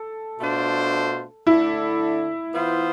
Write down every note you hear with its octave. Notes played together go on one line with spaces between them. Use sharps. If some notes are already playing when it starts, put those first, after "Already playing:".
Already playing: A4
B2 A3 D4 F4 C5
D3 A3 D4 E4 A4 D5
E3 B3 F4 C5